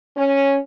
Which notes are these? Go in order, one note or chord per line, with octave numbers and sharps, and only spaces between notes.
C#4